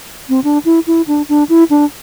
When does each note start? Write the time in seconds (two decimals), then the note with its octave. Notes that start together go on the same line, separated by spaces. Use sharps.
0.29 C4
0.44 D4
0.65 E4
0.87 E4
1.07 D4
1.29 D4
1.49 E4
1.70 D4